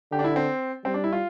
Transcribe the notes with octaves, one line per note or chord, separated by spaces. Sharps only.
D3 G4
D4
E4
C4
G3 C4
D4
E4
F4